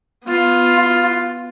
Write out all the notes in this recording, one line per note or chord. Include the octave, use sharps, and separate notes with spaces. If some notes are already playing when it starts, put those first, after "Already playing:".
B3 F4